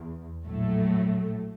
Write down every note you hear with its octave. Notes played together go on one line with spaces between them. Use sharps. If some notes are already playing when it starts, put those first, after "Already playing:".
Already playing: E2
A#1 A2 F#3 A3